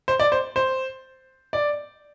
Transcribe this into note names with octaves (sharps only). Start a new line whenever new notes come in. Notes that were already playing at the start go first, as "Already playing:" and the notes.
C5
D5
C5
C5
D5